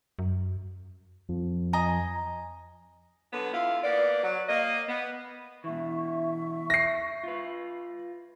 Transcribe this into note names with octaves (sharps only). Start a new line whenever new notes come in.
F#2
F2
D#5 G#5 A#5
D3 F#3 B3
D3 E4 F4 F5
A#3 B3 D5
F#3
A#3 D#5
B3
B2 E3 E5 C#6
A#6 C7
F4 B4